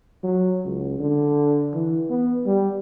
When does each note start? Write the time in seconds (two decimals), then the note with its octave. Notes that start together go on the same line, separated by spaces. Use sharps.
0.23 F#3
0.65 C#2
0.99 D3
1.74 E3
2.10 B3
2.46 G3